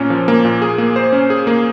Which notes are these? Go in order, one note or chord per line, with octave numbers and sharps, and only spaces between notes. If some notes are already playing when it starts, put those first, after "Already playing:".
Already playing: A#2 A#3 C#4
F3
A#3
A#2
G#4
A#3
C5
C#4
G#4
A#3